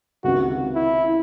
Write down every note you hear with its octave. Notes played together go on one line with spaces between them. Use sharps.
C#2 C3 D#3 F#4
E4